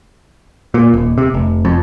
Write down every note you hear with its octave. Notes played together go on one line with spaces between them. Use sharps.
A#2
D#1
C3
F1
F2